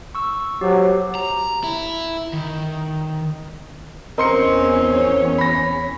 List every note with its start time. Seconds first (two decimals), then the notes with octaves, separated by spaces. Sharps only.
0.15 C#6 E6
0.61 F#3 G4 C5
1.15 A#5
1.64 E4
2.33 D#3
4.18 E2 C4 C#4 A#4 C#5 D#5 C6 C#7
5.38 B5 A#6